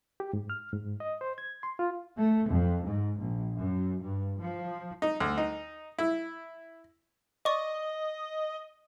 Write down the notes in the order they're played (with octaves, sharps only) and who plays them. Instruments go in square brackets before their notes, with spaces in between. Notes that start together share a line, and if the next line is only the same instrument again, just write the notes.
[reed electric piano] G4
G#2
F6
G#2
D#5
C5
G#6
C6
F4
[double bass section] A3
F2
G#2
A#1
F#2
G2
F3
[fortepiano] D#4
D2
D#4
E4
[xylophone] D5 C#6 D6 [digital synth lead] D#5